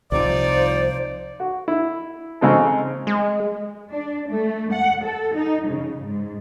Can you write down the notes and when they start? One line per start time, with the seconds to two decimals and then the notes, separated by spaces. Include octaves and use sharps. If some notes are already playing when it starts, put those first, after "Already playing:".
0.12 C2 C3 F3 D#4 F4 C5 D5
1.40 F#4
1.68 E4
2.41 C#3 G#3 C4 D#4 A4
3.07 G#3
3.91 D4
4.28 A3
4.73 F#5
5.04 A4
5.35 D#4
5.69 C#3
6.04 G#2